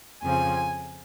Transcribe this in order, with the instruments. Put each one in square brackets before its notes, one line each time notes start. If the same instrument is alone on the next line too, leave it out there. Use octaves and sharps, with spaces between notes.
[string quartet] F2 C#3 F3 C4 G#5